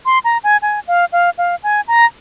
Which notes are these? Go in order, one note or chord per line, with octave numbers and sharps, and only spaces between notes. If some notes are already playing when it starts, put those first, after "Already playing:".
C6
A#5
G#5
G#5
F5
F5
F5
G#5
A#5